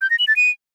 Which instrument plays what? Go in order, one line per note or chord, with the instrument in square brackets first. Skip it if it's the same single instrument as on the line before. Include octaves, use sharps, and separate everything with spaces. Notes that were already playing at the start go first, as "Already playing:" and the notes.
[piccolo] G6
A#6
F#7
A6
D#7